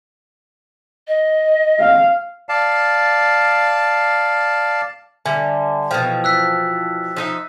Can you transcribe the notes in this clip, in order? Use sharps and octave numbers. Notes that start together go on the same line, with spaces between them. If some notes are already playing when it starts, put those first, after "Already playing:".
D#5
F5
D5 F5 A5
D3 G3 E5 G#5
B2 E3 F3 G5
E6 F#6 B6
F3 D#4 E5